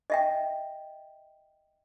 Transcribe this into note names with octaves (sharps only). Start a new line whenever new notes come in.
D#5 E5 G5